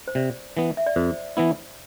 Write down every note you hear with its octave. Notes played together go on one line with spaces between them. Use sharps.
C5
C3 D5
E3 B3
E5
D5
F2 C5
E3 B3 E4